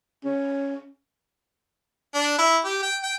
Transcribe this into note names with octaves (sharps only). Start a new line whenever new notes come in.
C#4
D4
E4
G4
G5
G5